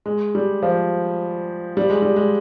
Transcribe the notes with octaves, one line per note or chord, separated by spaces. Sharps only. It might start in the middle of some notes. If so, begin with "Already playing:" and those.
G#3
G3
F3
G3
G#3
G3
G#3